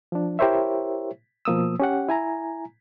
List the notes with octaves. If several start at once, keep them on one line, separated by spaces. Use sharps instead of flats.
F3 D4
E4 G4 A#4 C5 C#5 E5
B2 F3 A#3 D#6 E6
C#4 G4 F#5
E4 G#5 A#5